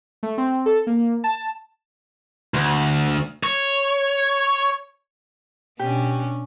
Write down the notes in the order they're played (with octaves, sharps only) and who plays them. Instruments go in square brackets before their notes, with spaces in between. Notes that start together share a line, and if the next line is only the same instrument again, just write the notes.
[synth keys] A3
C4
A4
A#3
A5
[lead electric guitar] D2
C#5
[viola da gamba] B2 C#4 D4 [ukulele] G4